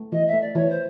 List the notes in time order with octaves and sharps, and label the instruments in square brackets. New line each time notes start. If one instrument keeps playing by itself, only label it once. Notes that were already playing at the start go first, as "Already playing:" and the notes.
Already playing: [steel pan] A3
[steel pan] E3 [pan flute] D#5
[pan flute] E5
[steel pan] A3
[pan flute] D5
[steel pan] E3 [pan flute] C#5
[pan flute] C5